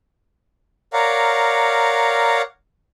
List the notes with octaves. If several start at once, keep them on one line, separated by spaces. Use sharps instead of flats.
A#4 C#5 D5 F5 F#5 A#5